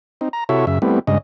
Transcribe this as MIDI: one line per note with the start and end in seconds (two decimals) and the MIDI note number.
0.21 0.29 60
0.21 0.29 63
0.33 0.44 82
0.49 0.65 48
0.49 0.65 64
0.49 0.65 66
0.49 0.65 69
0.49 0.65 73
0.49 0.65 76
0.67 0.79 42
0.67 0.79 49
0.67 0.79 76
0.82 0.99 55
0.82 0.99 57
0.82 0.99 59
0.82 0.99 60
0.82 0.99 64
1.07 1.18 43
1.07 1.18 49
1.07 1.18 56
1.07 1.18 75